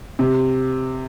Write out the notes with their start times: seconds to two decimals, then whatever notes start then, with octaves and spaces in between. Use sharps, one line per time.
0.19 C3